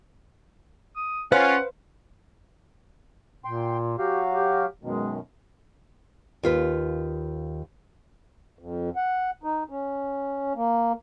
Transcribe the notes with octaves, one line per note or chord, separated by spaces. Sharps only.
D#6
C#4 F4 B4 C5 F5 F#5
A#2 G5 C6
F#3 F#4 G4 F5
G4
F#2 B2 D#3 G#3
D#2 F4 B4
F2
F#5
D#4
C#4
A#3